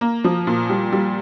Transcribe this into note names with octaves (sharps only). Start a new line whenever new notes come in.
A#3
F3
A#2
G3
G3